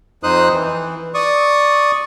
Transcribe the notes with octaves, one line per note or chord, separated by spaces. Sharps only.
F2 D#4 C5 D#6 F#6
E3
D5 C#6 D#6